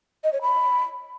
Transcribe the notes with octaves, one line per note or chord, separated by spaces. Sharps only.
D#5
C#5
B5